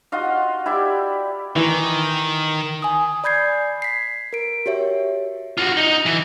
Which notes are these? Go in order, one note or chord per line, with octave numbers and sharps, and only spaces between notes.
F4 F#4 D#5 F5
E4 G4 D5 E5
D#3 E3
G#5 D#6
D5 B5 G6 G#6 C7
B6 C7
A#4 D7
F#4 G4 C#5 E5
F4 F#4
D#4
E3